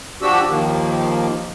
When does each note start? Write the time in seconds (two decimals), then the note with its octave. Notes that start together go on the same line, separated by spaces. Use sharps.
0.22 F3 D4 F#4 G4 E6
0.49 D#2 D#3 F3 A#3